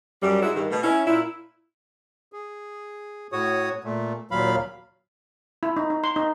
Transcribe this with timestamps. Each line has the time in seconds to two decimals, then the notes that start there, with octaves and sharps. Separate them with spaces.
0.22 F#2 G3
0.42 G#2 G#3 E4 F#4
0.55 G2 D#3
0.71 B2 A3
0.83 C#4 E4
1.06 A#2 E4
2.33 G#4
3.32 A2 F#4 C#5 D#6
3.84 A#2 A3
4.31 D#2 A#2 F#3 F5 B5
5.63 E4
5.77 D#4
5.90 D#4
6.04 C6
6.16 D#4